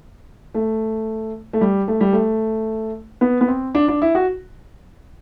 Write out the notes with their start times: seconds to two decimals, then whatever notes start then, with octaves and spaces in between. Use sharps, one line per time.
0.55 A3
1.53 A3
1.61 G3
1.88 A3
2.01 G3
2.13 A3
3.21 B3
3.41 B3
3.48 C4
3.75 D4
3.88 D4
4.02 E4
4.15 F#4